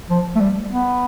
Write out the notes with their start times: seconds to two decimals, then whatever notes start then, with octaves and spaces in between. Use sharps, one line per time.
0.10 F3
0.36 A3
0.40 G3
0.71 B3